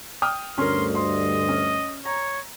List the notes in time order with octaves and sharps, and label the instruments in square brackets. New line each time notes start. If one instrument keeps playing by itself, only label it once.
[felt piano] G5 D#6 F6
[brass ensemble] D2 G2 [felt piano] C#4 A#4 [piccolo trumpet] C6
[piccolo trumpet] D#5 [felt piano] C6
[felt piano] C#4
[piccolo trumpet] C#5 [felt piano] A#5